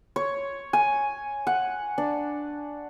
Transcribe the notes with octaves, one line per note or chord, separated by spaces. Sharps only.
C#5
G#5
F#5
D4